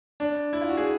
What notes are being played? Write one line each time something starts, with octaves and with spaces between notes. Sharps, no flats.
D4
E4
F4
F#4
G#4